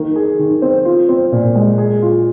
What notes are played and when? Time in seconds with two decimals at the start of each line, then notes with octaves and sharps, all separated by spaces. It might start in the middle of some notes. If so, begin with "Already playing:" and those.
Already playing: D#3 A#3
0.16 G#4
0.39 D#3
0.62 C4
0.85 F4
1.09 C4
1.32 A#2
1.55 G#3
1.78 G#4
2.02 F4